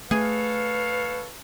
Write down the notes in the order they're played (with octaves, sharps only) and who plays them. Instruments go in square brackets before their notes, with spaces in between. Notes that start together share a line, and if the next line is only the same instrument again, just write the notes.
[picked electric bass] A3 [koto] G#4 [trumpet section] A4 C#5 F5 [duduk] B4